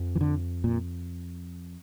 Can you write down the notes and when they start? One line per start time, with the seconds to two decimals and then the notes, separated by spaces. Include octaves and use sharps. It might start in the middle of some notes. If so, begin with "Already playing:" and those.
Already playing: F2
0.15 E3
0.21 D3
0.64 A#2